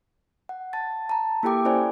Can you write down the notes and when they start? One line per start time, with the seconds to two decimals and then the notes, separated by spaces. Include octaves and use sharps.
0.49 F#5
0.73 A5 A6
1.09 A5 A#5
1.43 A#3 E4 G4 A4 G5 D6
1.65 C#4 E4 C5 D5 G#5